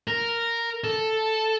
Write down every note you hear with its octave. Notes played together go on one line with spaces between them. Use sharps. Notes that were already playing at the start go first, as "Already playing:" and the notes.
A#4
A4